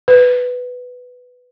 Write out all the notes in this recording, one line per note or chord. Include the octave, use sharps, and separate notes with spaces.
B4